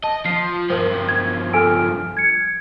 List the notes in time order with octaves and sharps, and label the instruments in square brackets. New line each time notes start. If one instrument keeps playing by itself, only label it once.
[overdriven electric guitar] D#5 [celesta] A5
[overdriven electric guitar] F3 [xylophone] C7
[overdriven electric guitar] G2 F3 [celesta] A#4 C5
[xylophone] G#6
[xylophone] A4 G#5 E6 [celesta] F6 D7
[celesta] G#6 C#7